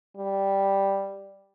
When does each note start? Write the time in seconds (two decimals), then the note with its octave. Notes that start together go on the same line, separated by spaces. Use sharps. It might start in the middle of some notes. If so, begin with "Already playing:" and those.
0.17 G3